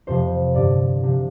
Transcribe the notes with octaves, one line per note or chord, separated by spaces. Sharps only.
F2 C3 F3 C5
G2 D3 F3 D5
C3 F3